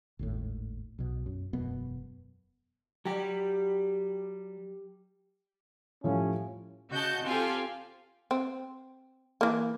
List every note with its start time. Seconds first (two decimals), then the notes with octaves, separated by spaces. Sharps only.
0.19 G#1 D#2 A2
0.98 B1 B2
1.26 F#2
1.53 E1 F#2 B2 B3
3.05 F#3 G3 G4
6.04 A2 F3 G3 C#4
6.91 C#3 F#4 D#5 A5 G6
7.25 C4 F4 G4 A4 F5 G#5
8.31 C4
9.41 E3 A#3